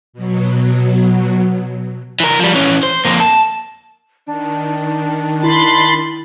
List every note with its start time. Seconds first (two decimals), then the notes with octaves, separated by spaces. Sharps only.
0.13 B2 F#3
2.20 E3 A#4
2.39 F3 G3
2.54 E3 C#4
2.83 C5
3.05 F2 A#3
3.20 A5
4.27 D#3 D4
5.43 E4 B5 C6 A6